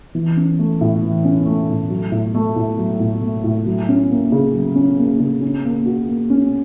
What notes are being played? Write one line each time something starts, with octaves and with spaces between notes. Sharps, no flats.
E3
C#4
A3
A2
E3
C#4
A3
A2
F#3
A2
A3
A2
F#3
A2
A3
A2
F#3
C#4
A#3
C#3
F#3
C#4
A#3
C#3
C#4
A#3
F#4
A#3
C#4